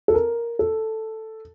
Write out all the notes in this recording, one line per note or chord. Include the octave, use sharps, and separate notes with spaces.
A4
A#4
A4